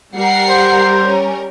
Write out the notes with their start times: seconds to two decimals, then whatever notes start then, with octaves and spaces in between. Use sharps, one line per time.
0.14 G3 A#4 F#5 C7
0.49 C5
1.02 C#4